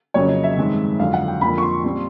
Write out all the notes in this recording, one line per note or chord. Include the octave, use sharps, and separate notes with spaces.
F2 C#3 F#3 A#3 C#4 C#5
D#5
E5
G2 D#3 G#3 C4
F2 D3 F#3 F5
F#5
G5
F2 D3 F3 A#3 B5
C#6
C6
A#2 G3 C4